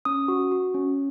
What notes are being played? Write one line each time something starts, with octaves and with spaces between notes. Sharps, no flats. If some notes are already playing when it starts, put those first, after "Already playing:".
C#4 D#6
F#4
F#4
C#4